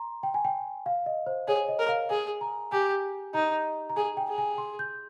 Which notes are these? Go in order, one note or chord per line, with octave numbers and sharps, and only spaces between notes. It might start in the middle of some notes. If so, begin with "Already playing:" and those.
Already playing: A#5 C6
G5
G#5
G5
F5
D#5
C5
G#4 C#5
D#5
A#4
F5
G#4 G#5
A#5
G4 G#5
D#4 A#5
A#5
G#4 G#5
G5
G#4
G#5
C6
G6